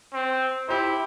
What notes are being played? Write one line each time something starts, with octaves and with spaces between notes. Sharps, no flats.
C4
E4 G4 C5